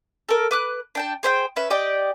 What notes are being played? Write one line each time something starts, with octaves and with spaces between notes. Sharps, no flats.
A4 A#4
B4 D6 F#6
D4 G5 A5
G#4 C5 E5 G5
C#4 B4 E5
G4 D5 D#5 G5